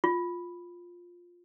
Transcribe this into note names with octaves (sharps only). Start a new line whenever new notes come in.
F4